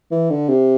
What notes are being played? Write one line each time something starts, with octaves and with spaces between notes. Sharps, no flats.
E3
D3
C3